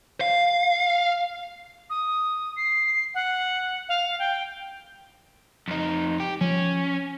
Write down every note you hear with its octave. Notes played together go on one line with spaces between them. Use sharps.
F5
D#6
C7
F#5
F5
G5
F2 D#4
G4
F3 C#4